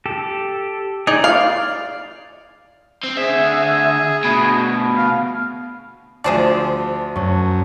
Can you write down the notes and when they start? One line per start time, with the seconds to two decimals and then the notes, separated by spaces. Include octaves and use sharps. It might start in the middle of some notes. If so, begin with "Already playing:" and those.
0.06 G4 A4
1.07 D#4 G#4 D5
1.24 D5 F5
3.04 C4
3.18 D2 G#4 E5
4.23 D2 B2
4.97 F5
6.24 D2 F3 G#4 C5 D5 A5
7.16 F#2 C#5 A5 C#6